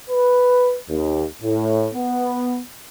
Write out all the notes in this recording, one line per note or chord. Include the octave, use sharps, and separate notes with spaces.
B4
D#2
A2
B3